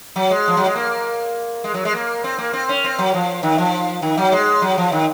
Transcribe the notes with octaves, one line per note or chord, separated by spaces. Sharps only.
F#3
G#3
F3
F#3
G#3
A#3
G#3
F#3
G#3
A#3
C4
A#3
C4
C#4
C4
F#3
F3
D#3
F3
D#3
F#3
G#3
F#3
F3
D#3